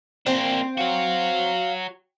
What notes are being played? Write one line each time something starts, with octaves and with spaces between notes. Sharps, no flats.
A#3 C4 D4
F#4 C#5 F5